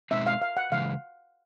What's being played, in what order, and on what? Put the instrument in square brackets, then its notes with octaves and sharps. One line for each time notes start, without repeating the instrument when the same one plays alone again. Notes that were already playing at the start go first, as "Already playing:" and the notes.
[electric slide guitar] B2 G#3 C4 D#4 [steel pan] E5
[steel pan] F5
F5
F#5
[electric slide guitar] C#3 E3 G#3 [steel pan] F5